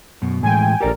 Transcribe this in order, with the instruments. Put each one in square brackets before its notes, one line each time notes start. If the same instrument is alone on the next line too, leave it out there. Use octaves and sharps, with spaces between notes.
[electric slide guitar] F#2 B2
[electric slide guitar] A2 E3 G#3 [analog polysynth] G5 G#5
[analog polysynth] A#1 A#4 [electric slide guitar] G4 A4 D5